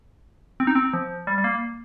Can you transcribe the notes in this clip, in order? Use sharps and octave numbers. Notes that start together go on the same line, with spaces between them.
C4
D#4
C4
F3
G3
G3
A#3